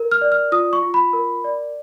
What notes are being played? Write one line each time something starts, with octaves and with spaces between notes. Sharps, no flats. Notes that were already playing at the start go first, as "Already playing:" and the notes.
Already playing: A#4
F6
D5
F6
F4 D#6
C#6
F4
B5
A#4
D5